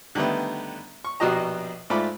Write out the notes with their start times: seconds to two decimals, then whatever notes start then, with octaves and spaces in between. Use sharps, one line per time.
0.15 D3 D#3 G3 A3 B3
1.05 C#6
1.20 A#1 B2 F#4 G4 D#5 A#5
1.90 G#2 A3 F4 D5 B5